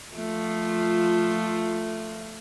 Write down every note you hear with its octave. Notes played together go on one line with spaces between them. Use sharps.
F3 A3 F4